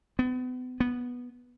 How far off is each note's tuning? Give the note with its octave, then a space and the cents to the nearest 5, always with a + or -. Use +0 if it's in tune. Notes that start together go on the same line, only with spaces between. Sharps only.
B3 +35
B3 -10